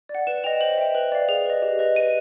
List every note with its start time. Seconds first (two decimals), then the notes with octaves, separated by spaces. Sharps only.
0.09 D5
0.15 F#5
0.27 B4 E7
0.44 D#5 G5 F7
0.60 C5 F#7
0.78 E5 G5
0.95 B4
1.12 D5 F5
1.29 G#4 F7
1.46 B4 D#5
1.62 G4
1.79 B4 D#5
1.96 B4 D#7